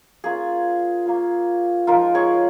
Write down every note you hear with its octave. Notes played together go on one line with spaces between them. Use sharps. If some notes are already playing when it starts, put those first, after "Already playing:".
A#3 C#4 F4 G#4
A#3 C#4 F4
F3 G#3 D#4 F4 A#4
G#4 C#5